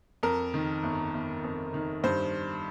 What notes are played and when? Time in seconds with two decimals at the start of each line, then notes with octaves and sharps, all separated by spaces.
0.23 F2 A#4
0.54 D#3
0.83 G1
1.14 G1
1.44 F2
1.74 D#3
2.04 G2 C5